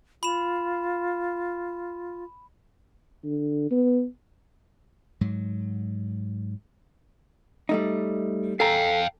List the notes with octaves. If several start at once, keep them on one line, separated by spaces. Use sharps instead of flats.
F4 B5 E7
D3
B3
G#2 F#3
G3 A3 D#4
A4 F5 G5 G#5 A#5